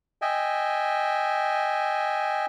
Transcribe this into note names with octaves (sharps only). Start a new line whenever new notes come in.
D#5 E5 G5 G#5